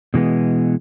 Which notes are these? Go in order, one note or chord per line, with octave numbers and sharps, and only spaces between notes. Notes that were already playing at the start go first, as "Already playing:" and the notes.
B2 E3 G#3 B3